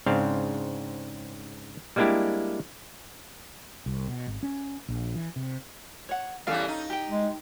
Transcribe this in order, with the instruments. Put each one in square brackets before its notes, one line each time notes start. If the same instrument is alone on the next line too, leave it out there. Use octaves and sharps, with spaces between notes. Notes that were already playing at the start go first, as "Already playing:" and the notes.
[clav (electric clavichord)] G#2 C#3 C4 D4 F5
G3 G#3 A#3 D4 E4 G4
[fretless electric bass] C2
B2
G#1
C#4
A#1
E3
C3
[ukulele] C#5 F#5
[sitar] E2 E3 G3 [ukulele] C#4 A4 F5
[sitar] D#4
[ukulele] G4 G5
[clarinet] G#3